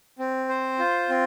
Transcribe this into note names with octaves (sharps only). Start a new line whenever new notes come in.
C4
C5
F4
C4